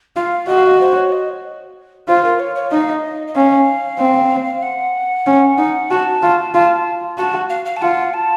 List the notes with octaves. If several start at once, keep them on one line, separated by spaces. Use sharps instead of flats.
F4 F5
F#4 D#5
F5
D#5
C5
C#5
D#5
F4 C5
A#4
C#5
C#5
D#4 D#5
F5
D#5
D#5
C#4 F5
C4
F#5
C#4
D#4
F#4 A5
F4
F4
F#4 A5
F5
F5
A5
F4 F#5
A5